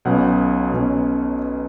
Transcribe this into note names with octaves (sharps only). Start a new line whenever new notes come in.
B1 B2 F#3 C#4 F#5
B1 B2 F#3 C#4